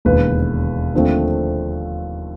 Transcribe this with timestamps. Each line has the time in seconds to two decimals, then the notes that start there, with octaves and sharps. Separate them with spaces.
0.05 E1 D#2 D3 B4
0.93 D#2 D3 F3 A3 C4